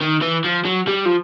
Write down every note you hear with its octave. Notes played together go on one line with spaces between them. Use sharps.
D#3
E3
F3
F#3
G3
F3